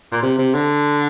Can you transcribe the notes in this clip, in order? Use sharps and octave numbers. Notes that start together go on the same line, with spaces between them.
A#2
C3
C3
D3